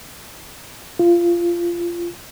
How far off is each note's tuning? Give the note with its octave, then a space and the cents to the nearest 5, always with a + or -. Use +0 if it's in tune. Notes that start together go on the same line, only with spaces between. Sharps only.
F4 -20